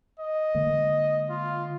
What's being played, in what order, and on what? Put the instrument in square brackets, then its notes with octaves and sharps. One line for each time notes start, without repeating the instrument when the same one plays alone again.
[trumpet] D#5
[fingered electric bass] D3 G#3 A#3
[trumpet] F4